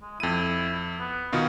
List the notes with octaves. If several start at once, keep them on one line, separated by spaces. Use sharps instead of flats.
G#3
F2 E4 D#7
B3
B2 D#3 D#4 F4